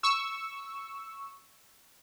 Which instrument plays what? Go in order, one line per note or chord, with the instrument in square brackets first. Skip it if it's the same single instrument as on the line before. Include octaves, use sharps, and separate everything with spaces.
[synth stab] C#6 E6